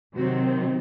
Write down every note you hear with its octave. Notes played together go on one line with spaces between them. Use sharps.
C3 D#3 F#3 C4 F#4